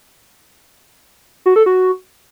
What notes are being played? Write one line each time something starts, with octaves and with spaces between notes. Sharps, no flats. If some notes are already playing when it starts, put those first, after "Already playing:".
F#4
A4
F#4